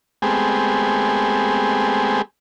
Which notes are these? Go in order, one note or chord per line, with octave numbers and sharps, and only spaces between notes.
G#3 A3 B3 C4 G4 G#4